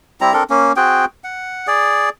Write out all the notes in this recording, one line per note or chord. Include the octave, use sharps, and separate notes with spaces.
G3 C4 E4 A#5
C4 D4 A4 A#4
A#3 C#4
C4 F#4 G#4 G5
F#5
G#4 D5